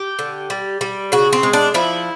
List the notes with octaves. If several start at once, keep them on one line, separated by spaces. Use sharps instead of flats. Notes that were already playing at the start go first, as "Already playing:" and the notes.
Already playing: G4
D3
G3
G3
C#3 F#4
C4
G#3
D4
F3 E4